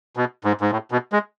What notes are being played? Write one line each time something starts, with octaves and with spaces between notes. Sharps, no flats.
B2
G#2
G#2
A2
B2
G#3